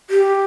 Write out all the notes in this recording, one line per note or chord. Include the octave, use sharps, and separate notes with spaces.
G4